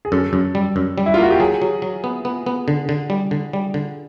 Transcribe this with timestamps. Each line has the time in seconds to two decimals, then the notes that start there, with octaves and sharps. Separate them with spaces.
0.05 G#4
0.12 F#2 A4
0.33 F#2
0.55 G3
0.76 F#2
0.98 G3
1.06 E4
1.14 F4
1.18 A#3 F#4
1.31 G4
1.40 F#3 G#4
1.62 F#3
1.82 F#3
2.04 B3
2.25 B3
2.46 B3
2.68 D3
2.89 D3
3.10 G3
3.31 D3
3.53 G3
3.74 D3